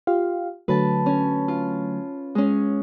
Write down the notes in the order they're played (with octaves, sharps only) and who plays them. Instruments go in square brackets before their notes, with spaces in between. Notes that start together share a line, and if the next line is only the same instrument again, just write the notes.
[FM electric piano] F4 G4 F5
[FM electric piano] D3 F#3 A3 [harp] B4 A5
[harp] C#4
F4
G#3 C#4